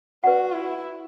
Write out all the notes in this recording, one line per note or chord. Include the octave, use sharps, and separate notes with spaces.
F#4 B4 D5 F#5
E4